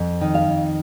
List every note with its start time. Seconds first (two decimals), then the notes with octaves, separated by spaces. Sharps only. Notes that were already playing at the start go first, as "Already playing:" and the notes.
Already playing: F2
0.21 D#3
0.34 F5
0.48 F2